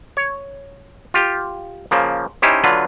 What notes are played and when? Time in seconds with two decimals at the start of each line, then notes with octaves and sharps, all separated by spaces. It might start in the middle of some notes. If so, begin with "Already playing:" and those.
0.17 C#5
1.14 F4 G4
1.91 C#3 F3 A#3
2.42 C#4 D#4 E4 G4 C5
2.64 D3 F#3 F4 B4